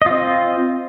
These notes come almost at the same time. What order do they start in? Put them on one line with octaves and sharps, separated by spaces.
D#5 F4 C4